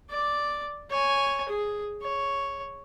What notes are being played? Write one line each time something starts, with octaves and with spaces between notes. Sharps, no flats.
D5 D6
C#5 G#5
G#4
C#5